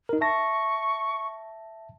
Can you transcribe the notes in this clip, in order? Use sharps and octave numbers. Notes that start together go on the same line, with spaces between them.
D#4 A#4
E5 A5 C#6 A#6